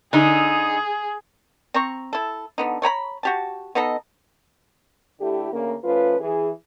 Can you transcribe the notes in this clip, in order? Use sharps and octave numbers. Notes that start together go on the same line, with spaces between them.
D3 D#4 G#4
C4 A#5 C#6
E4 A4
D3 B3 D#4
A3 C#5 A#5 B5
F#4 G4 A5
B3 D#4 A4 D#5
D3 A3 E4 G4
D2 C#3 A#3
F3 A3 C#4 F4 B4
E3 G#4